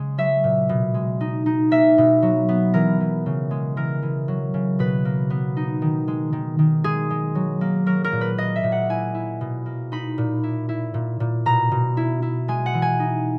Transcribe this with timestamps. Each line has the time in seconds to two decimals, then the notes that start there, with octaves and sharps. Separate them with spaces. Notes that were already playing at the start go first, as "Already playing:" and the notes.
Already playing: C#3 G#3
0.18 F#3 E5
0.44 A#2
0.69 B2
0.94 G#3
1.21 D#4
1.46 D#4
1.71 A#3 E5
1.98 B2
2.22 F#3
2.49 B3
2.74 E3 A#4
3.00 E3
3.26 C#3
3.51 G#3
3.76 E3 A#4
4.02 E3
4.28 F#3
4.54 C#3
4.79 B2 B4
5.05 A#3
5.30 B3
5.57 D#4
5.82 D#3
6.08 G#3
6.33 D#3
6.59 D#3
6.84 G#3 G#4
7.10 G#3
7.35 F#3
7.61 A#3
7.86 F#3 A#4
8.04 A#4
8.12 A#2
8.21 B4
8.38 A#3 D#5
8.56 E5
8.64 A#2
8.72 F#5
8.89 E4 G#5
9.14 E4
9.41 B2
9.66 A#3
9.92 D#4 B5
10.18 A#2
10.43 E4
10.69 E4
10.94 A#2
11.20 A#2
11.46 B2 A#5
11.72 B2
11.97 E4
12.22 E4
12.48 G#3 G#5
12.66 F#5
12.74 E3
12.82 G#5
13.00 D#4